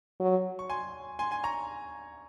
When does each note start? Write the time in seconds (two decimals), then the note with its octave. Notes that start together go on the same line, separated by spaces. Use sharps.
0.20 F#3
0.59 C#6
0.69 G#5 C6
1.19 G#5 C6
1.31 G#5 C6
1.44 A#5 C#6